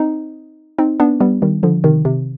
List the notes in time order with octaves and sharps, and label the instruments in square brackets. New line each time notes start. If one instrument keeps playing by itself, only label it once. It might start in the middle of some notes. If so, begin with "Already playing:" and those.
Already playing: [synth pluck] C4 D#4
C4 D#4
B3 D4
G3 B3
D#3 G3
D3 F3
C3 D#3
C3